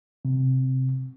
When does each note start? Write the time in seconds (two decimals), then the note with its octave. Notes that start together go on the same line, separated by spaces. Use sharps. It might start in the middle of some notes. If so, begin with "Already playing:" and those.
0.25 C3